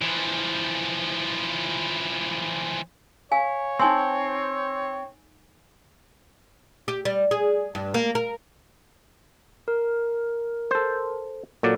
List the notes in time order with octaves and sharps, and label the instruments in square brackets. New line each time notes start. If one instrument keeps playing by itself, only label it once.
[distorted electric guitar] E3 F3
[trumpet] C#5 [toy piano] F5 G#5
[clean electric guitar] C4 [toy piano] D#4 G#5 C6
[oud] G4
G3
G#4
G2
A#3
A#4
[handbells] A#4
[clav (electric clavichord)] A4 C5
[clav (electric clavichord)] A#2 F#3 D5 [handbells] A4